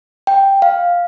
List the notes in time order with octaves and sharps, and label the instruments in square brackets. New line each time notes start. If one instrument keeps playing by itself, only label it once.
[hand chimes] G5
F5